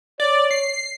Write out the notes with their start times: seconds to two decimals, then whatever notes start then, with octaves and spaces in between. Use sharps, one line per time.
0.20 C#5 D5
0.51 C7